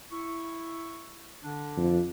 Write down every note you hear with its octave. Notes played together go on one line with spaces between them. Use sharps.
E4 C#6
D3 D4
F2